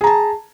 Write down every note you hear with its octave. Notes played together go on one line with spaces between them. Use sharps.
G#4 A5 A#5